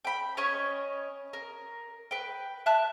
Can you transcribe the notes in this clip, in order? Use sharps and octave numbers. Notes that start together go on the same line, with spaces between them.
G5 B5
C#4 C#5 D#5 C#6
A#4
B4 G5
E5 A5 F#6